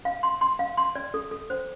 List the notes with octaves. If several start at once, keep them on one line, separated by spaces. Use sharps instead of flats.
F5
C6
C6
F5
C6
D5
A4
A4
C5